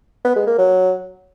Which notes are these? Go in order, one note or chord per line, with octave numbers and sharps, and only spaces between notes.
B3
G#3
A#3
F#3